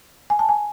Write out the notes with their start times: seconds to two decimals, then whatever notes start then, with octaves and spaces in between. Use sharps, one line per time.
0.30 G#5
0.39 A5
0.49 G#5